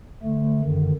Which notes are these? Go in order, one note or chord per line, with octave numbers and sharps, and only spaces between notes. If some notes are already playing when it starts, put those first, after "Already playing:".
D3 A3
F#2 D3 D#3